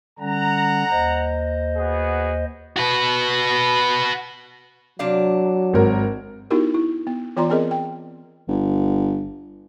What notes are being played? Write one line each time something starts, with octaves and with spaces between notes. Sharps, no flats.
D3 G3 C#4 F#5 A#5
D#2 C5 D#5
B3 F#4 G#4
F#4 B4
C3 F#3 D4 F5
G#1 A#4
B3 D#4 E4 F#4 G4 A#4
E4
B3
E3 B3 F4 D5 A#5 C6
B3 C4 G#4 A#4 D#5
G5
G1